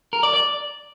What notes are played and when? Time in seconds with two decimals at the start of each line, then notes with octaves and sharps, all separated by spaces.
0.13 A#4
0.23 D5
0.34 D5